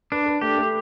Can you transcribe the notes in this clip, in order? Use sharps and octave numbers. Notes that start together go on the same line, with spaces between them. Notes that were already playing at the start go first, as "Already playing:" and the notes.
D4 B4
B4
A3 G4
A3